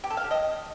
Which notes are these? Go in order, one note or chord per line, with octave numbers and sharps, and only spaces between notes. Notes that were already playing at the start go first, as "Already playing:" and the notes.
G4
A4
F5
G4
D#5